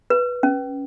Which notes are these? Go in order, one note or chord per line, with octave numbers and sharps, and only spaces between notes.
B4
C#4